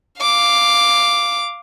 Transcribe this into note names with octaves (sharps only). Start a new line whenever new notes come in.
F5 D6